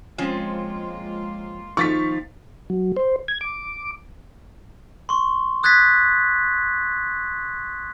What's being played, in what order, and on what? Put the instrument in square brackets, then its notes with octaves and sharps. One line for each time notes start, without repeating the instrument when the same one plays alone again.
[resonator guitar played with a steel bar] F3 C4 C#4 [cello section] G#3 A#3 F4
[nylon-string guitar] D#3 F3 F4 [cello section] A#3 F5 [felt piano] C#6 A6 B6
[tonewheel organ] F#3
C5
G#6
D6
[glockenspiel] C6 C#6
D#6 F#6 G#6 A6 B6